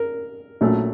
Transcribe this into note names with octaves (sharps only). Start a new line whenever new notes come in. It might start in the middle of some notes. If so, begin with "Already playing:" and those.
Already playing: A#4
A#1 A#2 F#3 A3 C#4